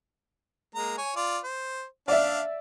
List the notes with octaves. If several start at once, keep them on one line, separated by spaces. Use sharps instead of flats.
G#3 A#3 A#5
C#5 G#5
F4 D5
C5
D4 D5 E5 F5